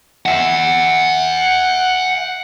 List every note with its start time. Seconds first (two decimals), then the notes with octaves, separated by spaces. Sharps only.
0.26 E5 F#5